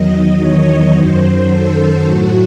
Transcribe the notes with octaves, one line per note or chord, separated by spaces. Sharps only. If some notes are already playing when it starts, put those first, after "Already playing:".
Already playing: E2 D#3 F#3 D#5
C#5
F#2 D#3 F#3 C5
A4
A2 F#3 F#4